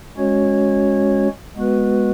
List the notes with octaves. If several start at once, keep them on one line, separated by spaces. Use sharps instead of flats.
G#3 C#4 F#4 C#5
G#3 B3 F#4 B4